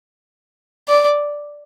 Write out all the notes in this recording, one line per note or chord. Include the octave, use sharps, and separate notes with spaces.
D5